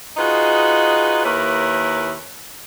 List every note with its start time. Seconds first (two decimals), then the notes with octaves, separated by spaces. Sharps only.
0.17 D#4 F4 F#4 G#4 B4 D#5
1.24 D#2 A#3 E4 A#4 B4 C#5